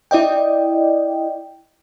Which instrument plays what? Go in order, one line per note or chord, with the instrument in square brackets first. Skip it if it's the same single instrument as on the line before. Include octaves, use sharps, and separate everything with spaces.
[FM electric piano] E4 D5 D#5 G5